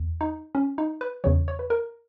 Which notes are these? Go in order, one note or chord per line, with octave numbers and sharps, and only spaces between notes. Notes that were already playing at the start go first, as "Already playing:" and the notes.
Already playing: E2
D#4
C#4
D#4
B4
E2 C#3 E3 C#5
C#5
B4
A#4